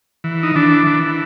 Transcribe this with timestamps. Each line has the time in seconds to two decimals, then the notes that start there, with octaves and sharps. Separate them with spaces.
0.24 E3
0.43 D#4
0.56 E3 D4
0.87 E3